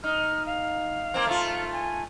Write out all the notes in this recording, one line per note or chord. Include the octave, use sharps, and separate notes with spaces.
D#4 F6
F5
A#3 C4
A3 F4
G#5